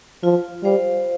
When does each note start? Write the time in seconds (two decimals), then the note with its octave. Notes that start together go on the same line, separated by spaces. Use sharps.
0.23 F3 F4
0.64 G3 C5 F5